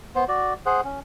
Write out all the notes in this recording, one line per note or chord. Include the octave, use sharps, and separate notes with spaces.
B3 C5
F#4 D5
G#4 C5 F#5
C#4